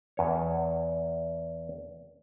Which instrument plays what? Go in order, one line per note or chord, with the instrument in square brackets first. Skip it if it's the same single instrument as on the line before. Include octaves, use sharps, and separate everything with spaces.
[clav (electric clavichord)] E2 C#5